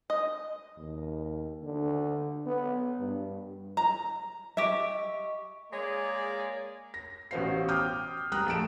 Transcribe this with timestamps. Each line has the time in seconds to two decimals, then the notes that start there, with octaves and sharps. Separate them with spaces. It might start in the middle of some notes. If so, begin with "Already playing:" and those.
0.10 D#5
0.77 D#2
1.63 D3
2.46 B3
2.98 G2
3.77 A#5
4.57 G4 D#5 E5 C#6
5.72 G#3 A#3 G#4 C#5 D5
6.94 A#6
7.31 A1 B2 F#4 C5 F5 C7
7.68 G5 D6 D#6 F6 G6
8.32 G3 G5 A#5 D#6 F#6
8.47 A#1 A3 A5 D7 E7